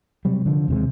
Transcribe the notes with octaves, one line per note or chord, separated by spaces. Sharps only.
C3 F#3 G3
D3 F3
D#2 C3 G#3